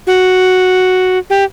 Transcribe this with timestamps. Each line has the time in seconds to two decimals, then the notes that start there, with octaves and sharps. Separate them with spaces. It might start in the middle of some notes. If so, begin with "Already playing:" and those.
0.07 F#4
1.30 G4